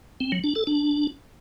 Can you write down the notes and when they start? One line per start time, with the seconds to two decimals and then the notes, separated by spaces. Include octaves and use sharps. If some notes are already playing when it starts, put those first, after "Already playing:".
0.20 C4
0.32 F#3
0.44 D4
0.55 A4
0.67 D4